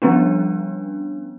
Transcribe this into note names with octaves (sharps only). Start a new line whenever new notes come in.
F3 G3 B3 C#4 D4